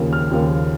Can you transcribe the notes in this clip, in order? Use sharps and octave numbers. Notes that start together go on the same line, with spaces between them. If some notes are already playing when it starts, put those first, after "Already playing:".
Already playing: D#2 C#3 F3 A#3
F6
D#2 C#3 F3 A#3